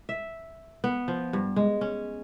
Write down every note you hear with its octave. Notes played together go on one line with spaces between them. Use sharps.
E5
B3
F3
G2
G#3
C#4